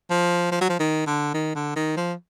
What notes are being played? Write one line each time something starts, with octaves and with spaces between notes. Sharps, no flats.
F3
F3
F#3
F3
D#3
D3
D#3
D3
D#3
F3